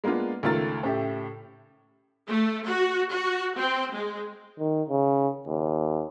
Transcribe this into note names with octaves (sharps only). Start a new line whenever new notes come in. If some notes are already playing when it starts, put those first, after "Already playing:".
G#3 A#3 B3 D4 F4
C#2 D#3 A3 F4 A#4 A6
A2 C#3 G4 E5
A3
F#4
F#4
C4
G#3
D#3
C#3
D#2